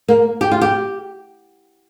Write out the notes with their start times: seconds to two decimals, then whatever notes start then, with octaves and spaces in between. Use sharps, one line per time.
0.08 A#3
0.41 G4
0.51 F4
0.61 G4